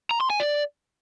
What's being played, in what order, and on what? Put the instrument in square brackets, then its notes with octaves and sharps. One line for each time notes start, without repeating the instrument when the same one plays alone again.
[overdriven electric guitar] A#5
C6
G#5
D5